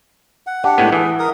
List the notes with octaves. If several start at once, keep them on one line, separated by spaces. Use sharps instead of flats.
F#5
D4 G4 F#5
A2 G#3 B3
E3 G#4
A#4 D#6